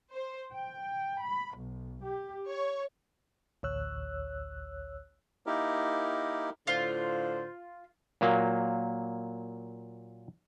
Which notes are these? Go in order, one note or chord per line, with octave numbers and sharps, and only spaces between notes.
C5
G5
B5
B1
G4
C#5
A1 D2 C#5 E6 F#6
A#3 D#4 E4 G4 A#4
A2 D3 F4 C5
A#2 F#3 A#3